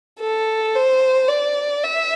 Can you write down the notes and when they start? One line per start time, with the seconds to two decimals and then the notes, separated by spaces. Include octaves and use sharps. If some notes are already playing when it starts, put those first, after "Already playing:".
0.20 A4
0.75 C5
1.28 D5
1.83 E5